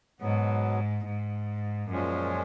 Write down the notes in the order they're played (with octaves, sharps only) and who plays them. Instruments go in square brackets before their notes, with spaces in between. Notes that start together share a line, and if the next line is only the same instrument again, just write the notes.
[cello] G#2 [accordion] B2 F#3 B3
[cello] G#2
[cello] F#2 [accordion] A#2 F3 G#3 C#4